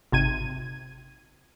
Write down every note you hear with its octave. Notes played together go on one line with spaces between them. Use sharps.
G#1 C3 G#6 D#7